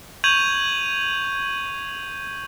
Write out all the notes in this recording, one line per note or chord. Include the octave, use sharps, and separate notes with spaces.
C#6 G6 G#6 D#7 F7 F#7